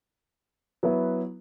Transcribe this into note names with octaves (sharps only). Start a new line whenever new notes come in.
F#3 B3 E4 B4